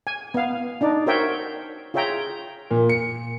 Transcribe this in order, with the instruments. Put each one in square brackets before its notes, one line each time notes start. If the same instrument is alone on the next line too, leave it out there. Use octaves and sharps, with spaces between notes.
[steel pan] G#5
B3 F5
D4 D#4 D5
F#4 A#4 C5 C#5 E5 G5
F4 G#4 C#5 E5 G5 A#5
[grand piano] A#2
C#7